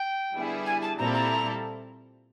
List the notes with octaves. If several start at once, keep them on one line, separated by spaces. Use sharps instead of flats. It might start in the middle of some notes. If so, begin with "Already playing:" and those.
Already playing: G5
D3 G3 B3 E4 G#4
G#5
A5
A#2 G3 C4 E4 A4 A#5
A#5